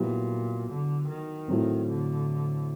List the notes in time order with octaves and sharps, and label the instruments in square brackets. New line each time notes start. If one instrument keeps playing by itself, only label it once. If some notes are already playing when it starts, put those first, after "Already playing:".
Already playing: [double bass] A#2 [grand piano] F#3 B3 E4 G4
[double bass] D3
D#3
[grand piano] A2 F#3 A3 C4
[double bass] D3